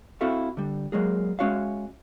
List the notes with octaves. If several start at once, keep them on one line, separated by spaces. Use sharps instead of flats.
C4 E4 F#4 A4 E5 F5
D3 G3
F#3 G#3 A#3 G#4
G#3 C#4 F#4 C#5 E5 F5